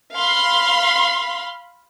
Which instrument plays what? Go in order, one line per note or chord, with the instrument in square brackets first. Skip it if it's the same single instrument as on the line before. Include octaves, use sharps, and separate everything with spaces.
[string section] F5 B5 C6